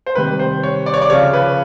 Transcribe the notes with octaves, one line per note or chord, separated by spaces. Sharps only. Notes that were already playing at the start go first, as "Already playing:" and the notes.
C5
C3 D#3 G3 B4
C5
C#5
D5
C#5
D5
C#3 F3 C#5
B4